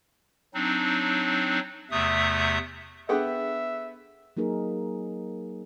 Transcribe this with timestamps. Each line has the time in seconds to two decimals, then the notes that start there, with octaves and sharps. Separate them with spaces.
0.54 F#3 C4 D4 D#4
1.91 E2 C3 A3 E5 D#6
3.09 B3 D4 G#4 A4 E5 F#5 G5
4.37 F#3 A#3 D#4 G#4 A#4